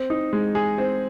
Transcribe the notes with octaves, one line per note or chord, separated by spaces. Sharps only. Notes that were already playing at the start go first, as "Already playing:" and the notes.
Already playing: C4
D#4
G#3
G#4
C4